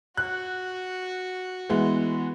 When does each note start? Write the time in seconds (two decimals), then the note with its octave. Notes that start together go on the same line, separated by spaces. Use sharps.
0.17 F#4 F#6
1.69 E3 G#3 B3